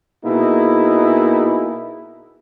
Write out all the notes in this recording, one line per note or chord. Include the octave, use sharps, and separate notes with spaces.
B2 A#3 D#4 E4 G#4